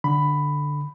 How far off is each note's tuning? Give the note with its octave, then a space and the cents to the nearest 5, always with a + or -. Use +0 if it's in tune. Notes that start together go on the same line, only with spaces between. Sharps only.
D3 +0 B5 +10